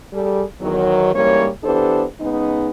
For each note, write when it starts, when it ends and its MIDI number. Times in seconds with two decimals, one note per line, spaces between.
0.13 0.43 55
0.13 0.43 68
0.13 0.43 69
0.61 1.11 40
0.61 1.11 51
0.61 1.11 54
1.14 1.48 44
1.14 1.48 52
1.14 1.48 55
1.14 1.48 58
1.14 1.48 61
1.14 1.48 73
1.64 2.05 52
1.64 2.05 59
1.64 2.05 62
1.64 2.05 67
1.64 2.05 69
1.64 2.05 72
2.20 2.70 49
2.20 2.70 56
2.20 2.70 59
2.20 2.70 63